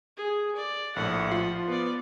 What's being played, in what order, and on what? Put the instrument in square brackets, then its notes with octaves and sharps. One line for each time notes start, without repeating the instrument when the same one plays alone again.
[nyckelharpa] G#4
D5
[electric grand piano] A#1 A2 [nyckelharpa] F#5
[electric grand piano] F3 F4 C7
[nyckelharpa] B3 D5